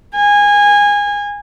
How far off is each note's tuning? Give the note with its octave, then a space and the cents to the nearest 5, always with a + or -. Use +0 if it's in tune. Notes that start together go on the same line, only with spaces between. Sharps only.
G#5 -20